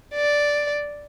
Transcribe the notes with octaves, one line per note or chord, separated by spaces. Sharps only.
D5